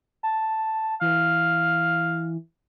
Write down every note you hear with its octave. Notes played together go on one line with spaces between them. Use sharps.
A5
E3 F5